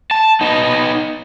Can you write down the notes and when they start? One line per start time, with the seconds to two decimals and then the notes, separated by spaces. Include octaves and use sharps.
0.11 A5
0.41 B3 D#4